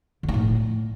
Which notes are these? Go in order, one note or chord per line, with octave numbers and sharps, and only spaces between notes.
D3
D#4
A2